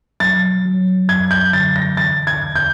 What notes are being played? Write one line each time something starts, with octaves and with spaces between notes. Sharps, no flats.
F#3 A6
F#3
F#2 G#6
G6
D3 A6
A#6
E3 A6
G#6
E2
G6